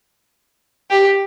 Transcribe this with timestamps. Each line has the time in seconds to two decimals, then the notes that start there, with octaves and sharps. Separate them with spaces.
0.90 G4